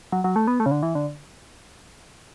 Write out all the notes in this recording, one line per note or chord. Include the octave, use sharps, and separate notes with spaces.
F#3
F#3
A3
B3
A3
C#3
D3
E3
D3